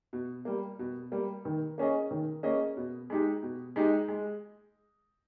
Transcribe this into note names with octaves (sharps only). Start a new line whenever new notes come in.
B2
G3 A#3
B2
G3 A#3
D#3
A#3 C#4 G#4 D#5
D#3
A#3 C#4 G#4 D#5
B2
G#3 D#4 G4
B2
G#3 D#4 G4
G#3